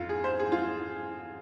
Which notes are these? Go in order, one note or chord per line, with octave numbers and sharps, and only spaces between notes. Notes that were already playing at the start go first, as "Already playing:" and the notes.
Already playing: F2 F4
G#4
C5
G#4
F4